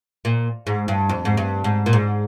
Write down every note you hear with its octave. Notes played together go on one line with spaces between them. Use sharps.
A#2
G#2
G2
F2
G#2
G2
G#2
A#2
G#2